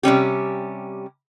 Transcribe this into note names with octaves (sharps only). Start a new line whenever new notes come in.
C3 G3 C#4 G4